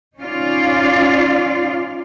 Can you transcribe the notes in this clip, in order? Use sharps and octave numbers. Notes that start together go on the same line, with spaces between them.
C#4 D#4 F4 D5 F5